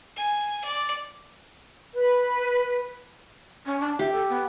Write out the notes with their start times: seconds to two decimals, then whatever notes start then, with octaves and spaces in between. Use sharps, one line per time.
0.17 G#5
0.65 D5
1.92 B4
3.66 C#4
3.80 D4
3.99 G4 E5
4.12 A4
4.29 B3